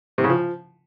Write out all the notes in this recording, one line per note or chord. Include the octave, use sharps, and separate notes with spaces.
C3
C#3
F3